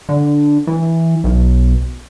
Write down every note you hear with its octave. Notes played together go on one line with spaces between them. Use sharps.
D3
E3
B1